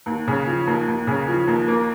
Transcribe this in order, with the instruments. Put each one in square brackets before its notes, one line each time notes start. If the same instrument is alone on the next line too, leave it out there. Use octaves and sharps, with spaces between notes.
[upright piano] D#2
C#3
F3
D#2
D#2
C#3
F3
D#2
A#3